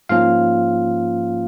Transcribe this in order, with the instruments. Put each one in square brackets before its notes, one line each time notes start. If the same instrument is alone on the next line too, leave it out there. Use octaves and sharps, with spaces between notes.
[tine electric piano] G#2 F3 A#3 C#4 F4 F5